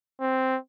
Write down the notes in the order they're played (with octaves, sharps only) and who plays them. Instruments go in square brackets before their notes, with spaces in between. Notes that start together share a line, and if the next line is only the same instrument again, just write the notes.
[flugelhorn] C4